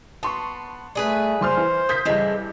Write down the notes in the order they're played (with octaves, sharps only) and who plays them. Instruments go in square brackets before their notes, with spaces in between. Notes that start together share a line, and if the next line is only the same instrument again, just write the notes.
[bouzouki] B3 [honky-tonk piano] A5 C6 C#6
[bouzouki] G3 G#4 B4 [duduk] A3
[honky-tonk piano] F#1 C6 F6 [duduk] C5
[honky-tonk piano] E3
[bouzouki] A#3 [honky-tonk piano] D#6 G6 B6
[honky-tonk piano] G2 E3 [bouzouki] C#3 G#3 A3